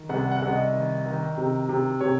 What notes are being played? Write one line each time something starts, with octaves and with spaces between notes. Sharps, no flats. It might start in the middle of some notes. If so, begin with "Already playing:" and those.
Already playing: D#3
C2 F#5
F#5
C2
D#5
D#3
D#3
C3
C3
C3 C#5